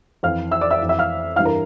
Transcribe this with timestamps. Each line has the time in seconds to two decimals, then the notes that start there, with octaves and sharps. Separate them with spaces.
0.23 F2 E3 F5 F6
0.51 E5 E6
0.61 D5 D6
0.71 E5 E6
0.80 F2 E3
0.89 E5 E6
0.99 F5 F6
1.36 G2 E3 F5 F6
1.45 A#4 A#5